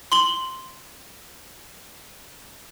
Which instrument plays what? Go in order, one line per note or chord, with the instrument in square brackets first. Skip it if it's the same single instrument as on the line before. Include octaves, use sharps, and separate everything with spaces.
[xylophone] C6 F#7 G7